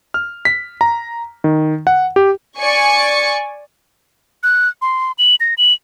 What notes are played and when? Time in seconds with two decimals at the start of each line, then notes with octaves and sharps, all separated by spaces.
0.14 F6
0.45 B6
0.81 A#5
1.44 D#3
1.87 F#5
2.16 G4
2.59 D5 G#5 C#6 C#7
4.43 F#6
4.82 C6
5.18 F#7
5.40 A#6
5.58 F#7